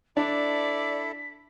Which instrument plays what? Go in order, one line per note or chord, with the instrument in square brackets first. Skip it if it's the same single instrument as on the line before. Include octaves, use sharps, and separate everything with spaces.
[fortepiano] D4 [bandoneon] E4 A4 [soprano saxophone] D5 [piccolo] B6